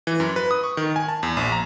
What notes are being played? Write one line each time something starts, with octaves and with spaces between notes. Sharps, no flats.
E3
F#2
B4
D#6
C#6
D#3
G#5
A5
E2
A#1
A#5